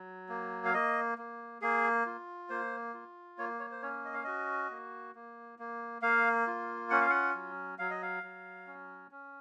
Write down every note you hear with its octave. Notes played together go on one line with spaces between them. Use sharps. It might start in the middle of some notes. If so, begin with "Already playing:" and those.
Already playing: F#3
A#3
F5
A#3 D#5
A#3
A#3 G#4
F4
A#3 C5
F4
A#3 C#5
C#5
C5
C#4 C#5
D#5
F5
F#4 D#5
A#3
A#3
A#3
A#3 F5
F4
C#4 F#5
F5
F#5
F#3
F#3 F5
D#5
F5
F#3
C#4
C#4